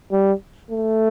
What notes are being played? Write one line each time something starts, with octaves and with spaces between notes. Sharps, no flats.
G3
A3